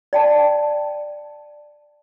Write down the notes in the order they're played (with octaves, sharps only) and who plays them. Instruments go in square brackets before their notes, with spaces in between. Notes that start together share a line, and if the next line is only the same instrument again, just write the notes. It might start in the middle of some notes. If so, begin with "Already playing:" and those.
[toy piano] D5 G5 A5